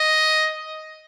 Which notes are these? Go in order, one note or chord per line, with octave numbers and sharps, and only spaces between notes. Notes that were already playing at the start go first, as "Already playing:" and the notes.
Already playing: D#5